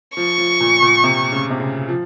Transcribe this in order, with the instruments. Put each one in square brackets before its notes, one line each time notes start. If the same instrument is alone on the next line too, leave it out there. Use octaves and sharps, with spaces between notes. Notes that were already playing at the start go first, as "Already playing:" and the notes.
[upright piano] F3 [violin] C#6
[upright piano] F3
A#2
A#2
C3
C#3
C3
C#3
F3